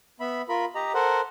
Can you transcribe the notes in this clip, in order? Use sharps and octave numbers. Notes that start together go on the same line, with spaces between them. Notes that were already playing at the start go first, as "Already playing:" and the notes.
B3 E5 B5
F4 A#4 B5
G4 D#5 A#5
A4 A#4 C5 F#5